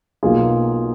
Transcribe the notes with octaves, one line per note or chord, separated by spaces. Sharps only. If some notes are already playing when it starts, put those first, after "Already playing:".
B1 B2 A#3 F4 G#4